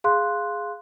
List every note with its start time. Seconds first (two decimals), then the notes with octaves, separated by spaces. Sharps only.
0.04 G#4 F5 C6 F#6